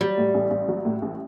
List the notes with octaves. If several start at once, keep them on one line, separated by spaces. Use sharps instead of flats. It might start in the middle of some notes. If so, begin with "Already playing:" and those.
F#3 G3
A2
A1
A1
F#3
A2
A1